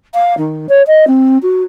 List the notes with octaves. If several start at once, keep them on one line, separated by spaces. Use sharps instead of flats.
F5
D#3
C#5
D#5
C4
F#4